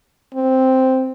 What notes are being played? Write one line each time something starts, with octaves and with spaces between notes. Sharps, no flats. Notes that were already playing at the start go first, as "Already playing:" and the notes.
C4